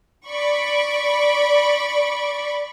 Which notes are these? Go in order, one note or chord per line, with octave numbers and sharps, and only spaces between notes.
D5 B5 C#6